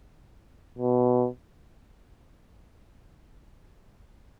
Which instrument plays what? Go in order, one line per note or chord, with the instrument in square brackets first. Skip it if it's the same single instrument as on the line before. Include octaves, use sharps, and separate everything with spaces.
[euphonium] B2